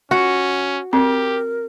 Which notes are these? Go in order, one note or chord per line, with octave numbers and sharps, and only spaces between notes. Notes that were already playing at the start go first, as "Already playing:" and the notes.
C#4 F#4
C4 G4 A#4